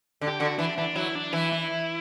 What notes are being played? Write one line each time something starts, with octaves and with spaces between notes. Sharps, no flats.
D3
G4
D3 F#4
E3 D4
E3 D4
F#3 E4
D4
E3 E4
E4